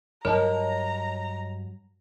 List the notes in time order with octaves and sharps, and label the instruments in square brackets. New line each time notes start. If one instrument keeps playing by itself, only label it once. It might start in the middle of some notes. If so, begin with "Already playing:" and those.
[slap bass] G2 F#3 [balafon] A#4 [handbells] C#5 D#5 A5 [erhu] A#5